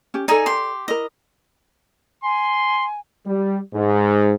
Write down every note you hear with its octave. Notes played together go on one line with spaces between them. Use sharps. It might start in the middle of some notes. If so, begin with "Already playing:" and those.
C#4 G4
D#4 G#4 A4 D5 G#5
G4 C6
E4 A#4 D#5
G#5 C6
G3
G#2